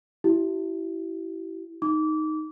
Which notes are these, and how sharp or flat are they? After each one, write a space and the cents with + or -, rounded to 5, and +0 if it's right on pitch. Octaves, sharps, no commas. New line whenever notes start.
E4 +0 G4 -40
D#4 +0 D6 -25